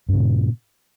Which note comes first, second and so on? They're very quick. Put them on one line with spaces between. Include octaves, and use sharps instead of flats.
G2 C#3 A#2